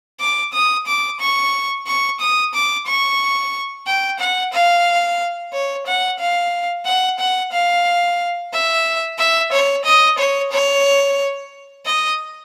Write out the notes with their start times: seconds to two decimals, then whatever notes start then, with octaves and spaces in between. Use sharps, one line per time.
0.20 D6
0.53 D#6
0.86 D6
1.20 C#6
1.86 C#6
2.20 D#6
2.54 D6
2.86 C#6
3.86 G5
4.19 F#5
4.53 F5
5.53 C#5
5.87 F#5
6.19 F5
6.85 F#5
7.19 F#5
7.52 F5
8.53 E5
9.18 E5
9.52 C#5
9.85 D#5
10.18 C#5
10.52 C#5
11.85 D#5